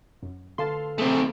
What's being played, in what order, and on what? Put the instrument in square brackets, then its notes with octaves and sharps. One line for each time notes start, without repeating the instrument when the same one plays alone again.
[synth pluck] F#2
[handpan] D3 A4 F5 [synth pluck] A5 C6
[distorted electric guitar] A3 C4 [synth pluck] G#4